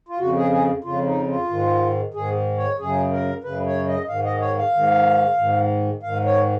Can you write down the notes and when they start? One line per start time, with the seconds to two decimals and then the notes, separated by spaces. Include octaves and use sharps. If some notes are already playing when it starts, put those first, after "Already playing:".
0.09 F4
0.19 F2 C#3 F#4
0.36 G#4
0.52 G#4
0.84 F2 C#3 F4
1.06 D#4
1.28 F4
1.49 G#2 D#3
2.14 G#2 D#3 G#4
2.57 C#5
2.79 F#2 C#3 G#4
3.11 A#4
3.44 F#2 C#3 B4
3.66 C#5
3.87 D#5
4.08 G#2 D#3 F5
4.25 D#5
4.41 C#5
4.58 F5
4.74 G#2 D#3
5.38 G#2 D#3
6.03 G#2 D#3 F5
6.25 C#5